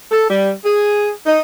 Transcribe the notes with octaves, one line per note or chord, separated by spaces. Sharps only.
A4
G3
G#4
D#4